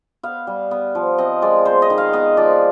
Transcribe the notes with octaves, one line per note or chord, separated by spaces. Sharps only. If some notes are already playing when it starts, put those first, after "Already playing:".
B3 F5
G3
B3
F3
C4 D#5
G#3 D5
B3 C5
D#5
D#3
F5
B3 D#5
F3 D5